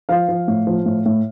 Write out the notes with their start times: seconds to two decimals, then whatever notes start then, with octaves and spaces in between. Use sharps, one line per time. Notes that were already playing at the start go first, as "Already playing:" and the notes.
0.09 F3 F5
0.28 F3
0.48 A2
0.67 F3
0.86 A2
1.06 A2